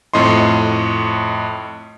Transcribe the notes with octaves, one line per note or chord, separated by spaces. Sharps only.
F2 A2 D#5 C6